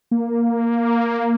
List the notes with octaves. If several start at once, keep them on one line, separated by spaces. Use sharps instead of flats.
A#3